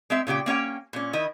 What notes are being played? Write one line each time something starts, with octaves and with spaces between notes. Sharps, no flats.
G#3 C4 E5
A#2 C#3 G4 G5
A#3 C#4 C#5 G5
A#2 C#4
D#3 E4 D#5